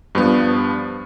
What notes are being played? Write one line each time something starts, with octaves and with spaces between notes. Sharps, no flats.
G2 F3 B3